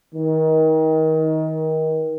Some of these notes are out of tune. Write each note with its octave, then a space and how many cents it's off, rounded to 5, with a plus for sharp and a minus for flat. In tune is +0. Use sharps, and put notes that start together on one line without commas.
D#3 +25